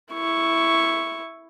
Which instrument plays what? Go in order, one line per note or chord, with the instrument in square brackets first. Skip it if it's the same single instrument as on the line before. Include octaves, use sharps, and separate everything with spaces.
[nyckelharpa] E4 C#6